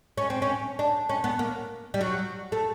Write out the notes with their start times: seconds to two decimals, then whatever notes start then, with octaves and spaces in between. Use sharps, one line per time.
0.18 C#4
0.30 C4
0.42 C#4
0.79 D4
1.09 C#4
1.24 B3
1.39 A#3
1.94 G3
2.01 F#3
2.52 A3